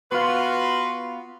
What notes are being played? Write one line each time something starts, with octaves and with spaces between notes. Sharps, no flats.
B3 F4 F#4 B4 C6